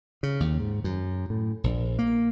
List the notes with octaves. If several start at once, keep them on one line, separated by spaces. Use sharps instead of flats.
C#3
D#2
G#2
F#2
A2
A#1
A#3